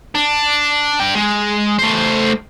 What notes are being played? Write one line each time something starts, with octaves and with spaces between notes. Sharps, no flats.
D4
D4 G5
G#3
A3 C5